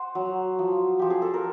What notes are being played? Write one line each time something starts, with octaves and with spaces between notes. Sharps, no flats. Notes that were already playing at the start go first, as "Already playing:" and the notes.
Already playing: C5 F#5
F#3
F3
F3 G4
G#4
A4
A#4